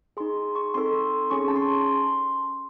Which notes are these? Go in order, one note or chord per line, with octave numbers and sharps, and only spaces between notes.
D#4 G#4 C6
C#6
C4 D#4 A4 C6
C#4 G#4 C#6
C6
A5
C6